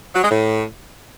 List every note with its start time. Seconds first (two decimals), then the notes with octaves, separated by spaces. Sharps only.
0.14 F#3
0.23 G#3
0.31 A2